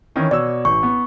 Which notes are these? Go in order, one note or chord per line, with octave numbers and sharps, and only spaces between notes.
D#3 E3 C#4
B2 C#5 D5 E6
A1 C#6
B3